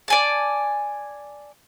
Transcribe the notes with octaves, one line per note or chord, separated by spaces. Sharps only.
D5 G#5 A5